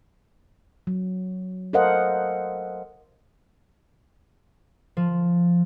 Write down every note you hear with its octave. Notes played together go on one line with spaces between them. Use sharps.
F#3
A4 A#4 C5 D#5 F5 F#5
F3